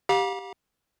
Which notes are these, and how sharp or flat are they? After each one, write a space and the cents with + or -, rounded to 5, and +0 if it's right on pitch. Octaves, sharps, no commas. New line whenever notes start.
G4 +0 F5 +40 A#5 +45